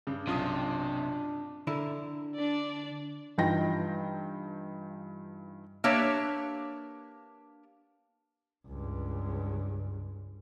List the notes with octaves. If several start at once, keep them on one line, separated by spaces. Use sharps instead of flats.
G2 C#3
B1 C3 D4 F4 D#6
D3 E4 A#4
D4 D5
G2 E3 D#4 F4 G5 A#6
A#3 D4 G4 B4 C#5 E5
C#2 G2